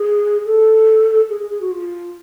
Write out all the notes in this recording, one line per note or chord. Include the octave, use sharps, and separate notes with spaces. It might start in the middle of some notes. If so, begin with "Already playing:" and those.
Already playing: G#4
A4
G#4
G#4
G#4
F#4
F4